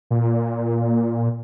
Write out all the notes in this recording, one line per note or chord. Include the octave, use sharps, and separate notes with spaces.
A#2